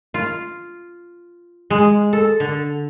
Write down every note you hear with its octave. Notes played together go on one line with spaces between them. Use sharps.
F4
G#3
A4
D3